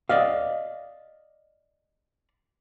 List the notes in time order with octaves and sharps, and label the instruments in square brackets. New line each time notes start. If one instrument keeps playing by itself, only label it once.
[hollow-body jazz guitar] D5 D#5 F5